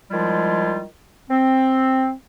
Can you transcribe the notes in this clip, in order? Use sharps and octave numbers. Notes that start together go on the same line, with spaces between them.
D#3 F3 G3 G#3 E4 F4
C4